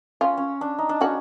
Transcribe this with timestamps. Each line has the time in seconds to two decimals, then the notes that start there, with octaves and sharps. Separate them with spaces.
0.21 C#4 F4
0.37 C#4
0.61 D4
0.78 D#4
0.89 D4
1.01 C#4 F#4